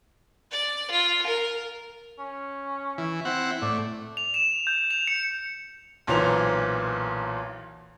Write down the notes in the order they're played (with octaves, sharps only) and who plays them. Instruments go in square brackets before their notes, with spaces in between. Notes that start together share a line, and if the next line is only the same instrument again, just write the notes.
[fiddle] D5
F4
A#4
[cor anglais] C#4
[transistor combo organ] E3
C4 E4 F#5
[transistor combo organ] A2 [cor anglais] D5
[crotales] F7
E7
G6
F7
C#7
[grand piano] B1 A#2 E3 C5 F7